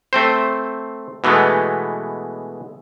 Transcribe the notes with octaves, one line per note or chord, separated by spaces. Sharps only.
A3 C4 C5
B2 E3 G#3 A3 B3